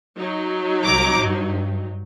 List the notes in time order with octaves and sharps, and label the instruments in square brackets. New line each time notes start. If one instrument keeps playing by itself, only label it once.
[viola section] F#3 D#4
[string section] C2 A#5 D6
G2